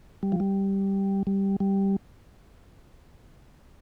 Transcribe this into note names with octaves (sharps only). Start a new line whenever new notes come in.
G3
F3
G3
G3
G3